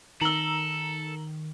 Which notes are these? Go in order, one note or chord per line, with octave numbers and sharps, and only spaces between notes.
D#3 A4 A#5 E6 F#7 G7